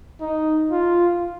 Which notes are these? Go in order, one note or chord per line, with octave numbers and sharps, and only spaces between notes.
D#4
F4